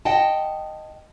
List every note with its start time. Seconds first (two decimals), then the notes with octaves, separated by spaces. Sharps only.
0.05 D#5 F#5 G5 A5